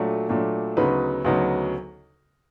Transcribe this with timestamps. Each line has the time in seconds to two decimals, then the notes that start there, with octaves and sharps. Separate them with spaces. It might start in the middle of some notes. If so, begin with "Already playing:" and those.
Already playing: A#2 F#3 A3 D4
0.29 A#2 F#3 A3 D4
0.77 D2 C#3 F#3 B3 D#4 B4
1.24 D2 C#3 F#3 B3 D#4